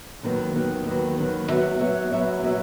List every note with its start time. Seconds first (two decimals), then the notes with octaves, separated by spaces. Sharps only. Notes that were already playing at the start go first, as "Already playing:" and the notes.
0.23 D#2 D#3 F#3 B3
0.55 D#2 D#3 F#3 B3
0.86 D#2 D#3 F#3 B3
1.18 D#2 D#3 F#3 B3
1.49 F#3 B3 F#4 C#5 E5
1.80 F#3 B3 F#4 C#5 E5
2.12 F#3 B3 F#4 C#5 E5
2.42 F#3 B3 F#4 C#5 E5